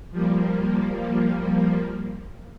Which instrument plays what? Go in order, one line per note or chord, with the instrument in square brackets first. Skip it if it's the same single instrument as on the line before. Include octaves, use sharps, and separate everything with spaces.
[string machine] F3 G3 A#3